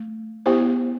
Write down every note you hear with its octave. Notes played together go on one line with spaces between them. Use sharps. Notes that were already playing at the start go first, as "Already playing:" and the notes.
Already playing: A3
B3 E4 G4 C5